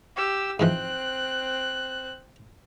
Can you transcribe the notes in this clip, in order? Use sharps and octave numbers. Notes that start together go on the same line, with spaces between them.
G4 E6
G#2 E3 F3 C4 F#6